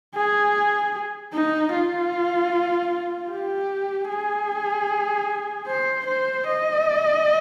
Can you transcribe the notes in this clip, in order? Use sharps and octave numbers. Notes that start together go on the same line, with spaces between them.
G#4
D#4
F4
G4
G#4
C5
C5
D#5